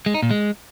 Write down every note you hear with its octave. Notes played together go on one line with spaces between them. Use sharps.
G#3
D#4
A#2
G#3